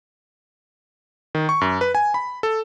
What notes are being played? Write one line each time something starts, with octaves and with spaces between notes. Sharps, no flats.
D#3
C#6
F#2
B4
G#5
B5
A4